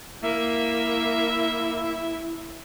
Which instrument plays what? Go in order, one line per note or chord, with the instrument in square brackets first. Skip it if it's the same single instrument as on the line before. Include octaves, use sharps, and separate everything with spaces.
[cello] A#3 [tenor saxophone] E4 [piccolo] E5